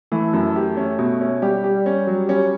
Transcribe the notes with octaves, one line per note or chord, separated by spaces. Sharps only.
E3 A3
F#2
G4
C#4
B2
C#4
G3 G4
G4
C#4
F#3
C#4